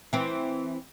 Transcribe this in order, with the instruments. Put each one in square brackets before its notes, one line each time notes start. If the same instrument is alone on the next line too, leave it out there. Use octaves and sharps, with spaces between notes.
[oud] E3 C4